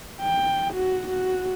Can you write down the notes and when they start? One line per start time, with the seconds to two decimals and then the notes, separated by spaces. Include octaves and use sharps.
0.21 G5
0.74 F#4
1.08 F#4